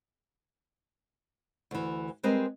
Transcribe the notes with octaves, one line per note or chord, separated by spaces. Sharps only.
D2 E3
G3 G#3 C4 A#4 B4 D#5